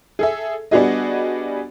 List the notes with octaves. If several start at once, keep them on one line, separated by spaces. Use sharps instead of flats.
G#4 A4 E5
G3 B3 D4 F#4 G#4 D#5